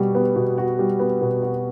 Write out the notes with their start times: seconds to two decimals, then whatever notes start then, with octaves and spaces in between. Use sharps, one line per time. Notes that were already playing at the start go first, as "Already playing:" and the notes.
Already playing: B2 G3 F#4
0.15 B3
0.36 B2
0.58 F#4
0.79 G3
0.99 B3
1.21 B2
1.42 F#4